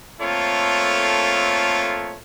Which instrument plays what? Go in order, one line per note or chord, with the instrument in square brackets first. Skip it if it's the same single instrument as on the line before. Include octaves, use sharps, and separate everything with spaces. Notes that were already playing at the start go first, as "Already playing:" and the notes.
[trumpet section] A3 A#3 C4 F4 A4 C#5